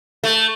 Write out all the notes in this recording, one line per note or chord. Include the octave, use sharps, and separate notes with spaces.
A3